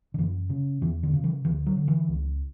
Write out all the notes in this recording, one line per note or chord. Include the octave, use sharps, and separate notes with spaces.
D3
F#2 E3
C#3
E2 E3
D3
C#3
E3
D2 E3
F#3
D3
E3
C#2